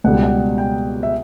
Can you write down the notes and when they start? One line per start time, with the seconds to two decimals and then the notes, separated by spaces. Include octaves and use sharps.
0.04 C#2 B2 G3 F#5
0.13 G5
0.23 F#5
0.58 G5
1.03 E5